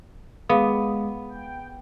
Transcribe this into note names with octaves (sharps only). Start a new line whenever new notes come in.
G#3 B3 G#4 F5 D#6
G5